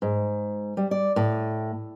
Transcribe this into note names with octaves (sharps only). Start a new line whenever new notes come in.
G#2
G3
D5
A2